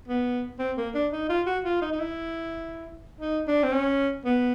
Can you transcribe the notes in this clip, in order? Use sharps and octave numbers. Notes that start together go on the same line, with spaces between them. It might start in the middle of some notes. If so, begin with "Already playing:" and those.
B3
C4
A#3
D4
D#4
F4
F#4
F4
D#4
D#4
E4
D#4
D4
C4
C#4
B3